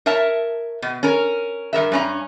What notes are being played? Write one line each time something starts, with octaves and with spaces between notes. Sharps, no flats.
A#4 C#5 E5 A5
B2
C#4 A#4
G2 E3 A#4 E5
G2 C#4 A#5